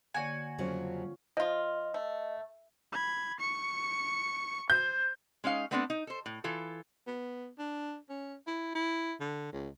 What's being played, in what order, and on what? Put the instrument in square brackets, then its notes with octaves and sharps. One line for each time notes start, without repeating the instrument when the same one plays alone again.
[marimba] D3 A#3 D5 [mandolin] F#4 G#5 [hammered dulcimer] C#5 F#5
[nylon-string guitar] F2 C#3 F#3 [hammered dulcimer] F3 C#4
[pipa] F3 F4 [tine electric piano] D#5
[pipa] A3
[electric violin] B5 G#6
C#6 C#7
[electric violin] C5 [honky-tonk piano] G6
[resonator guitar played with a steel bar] G#3 C#4 D#4 F5
A3 B3 C4 D4 G4 A4
D#4
A4 C5
A2
E3 F4 A4
[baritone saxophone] B3
D4
C#4
E4
E4
D3
C#2